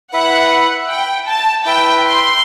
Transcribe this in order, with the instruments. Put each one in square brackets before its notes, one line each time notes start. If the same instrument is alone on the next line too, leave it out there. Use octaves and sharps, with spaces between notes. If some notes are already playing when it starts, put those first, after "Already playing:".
[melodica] E4 B4 E5 [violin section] F#5
[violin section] G5
A5
[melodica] E4 B4 E5 [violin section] G5
[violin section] C6